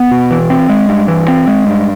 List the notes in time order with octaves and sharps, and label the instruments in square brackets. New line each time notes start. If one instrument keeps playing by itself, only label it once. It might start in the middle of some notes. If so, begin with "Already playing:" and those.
Already playing: [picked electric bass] B3
B2
E3
C4
G#3
G2
E3
C4
G#3
G2